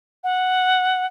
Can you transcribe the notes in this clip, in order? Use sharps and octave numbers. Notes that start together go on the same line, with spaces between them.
F#5